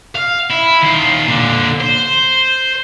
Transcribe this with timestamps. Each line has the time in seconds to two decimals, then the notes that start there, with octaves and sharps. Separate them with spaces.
0.16 F5
0.50 E4
0.82 D#3 F4
1.28 A#2 D3
1.81 C5